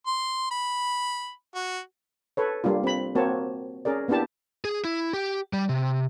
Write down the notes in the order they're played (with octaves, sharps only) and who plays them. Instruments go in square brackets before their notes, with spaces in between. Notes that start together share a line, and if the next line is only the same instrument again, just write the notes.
[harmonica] C6
B5
F#4
[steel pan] A4 B4 C#5
G3 A#3 D4 F4
C4 B5
A#3 C4 F#4 C#5 A5
C#4 G#4 A#4 D5
A#3 B3 D4 E4 G4 A5
[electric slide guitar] G#4
E4
G4
G3
C3